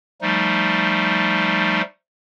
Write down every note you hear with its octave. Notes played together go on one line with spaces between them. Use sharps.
F3 G3 A3 D#4